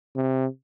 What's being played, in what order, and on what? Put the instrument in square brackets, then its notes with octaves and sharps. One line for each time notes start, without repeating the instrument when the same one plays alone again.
[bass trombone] C3